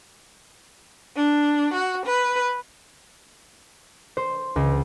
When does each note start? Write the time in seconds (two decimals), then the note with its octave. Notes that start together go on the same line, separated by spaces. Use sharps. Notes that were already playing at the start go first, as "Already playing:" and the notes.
1.16 D4
1.74 F#4
2.06 B4
4.17 C5
4.56 C#2